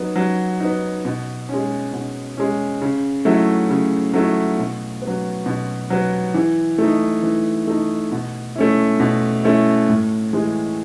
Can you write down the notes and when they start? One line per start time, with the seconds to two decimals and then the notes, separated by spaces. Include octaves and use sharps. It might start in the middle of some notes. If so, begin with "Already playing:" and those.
Already playing: F#3 B3 D#4
0.16 F#3
0.60 B3 D#4
1.05 B2
1.49 G#3 C#4
1.93 B2
2.37 G#3 C#4
2.82 C#3
3.25 F#3 A3 E4
3.70 C#3
4.14 F#3 A3 E4
4.58 B2
5.02 B3
5.07 F#3
5.46 B2
5.90 F#3 B3
6.34 E3
6.78 A3
6.84 D#4
7.23 E3
7.67 A3 D#4
8.12 B2
8.56 A3 C#4 E4
9.00 B2
9.44 A3 C#4 E4
9.89 A2
10.33 E3 G#3